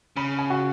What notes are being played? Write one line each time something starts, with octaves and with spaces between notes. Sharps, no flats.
C#3 B5
G#5
F#4